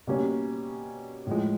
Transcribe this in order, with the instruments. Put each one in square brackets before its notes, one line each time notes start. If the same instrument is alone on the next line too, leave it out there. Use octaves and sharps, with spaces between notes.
[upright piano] B2 G3 A#3 C#4
A2 F3 G#3